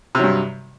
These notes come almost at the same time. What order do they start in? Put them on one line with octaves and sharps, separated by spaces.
C3 F#3 G2